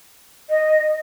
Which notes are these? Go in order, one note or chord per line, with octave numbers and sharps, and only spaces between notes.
D#5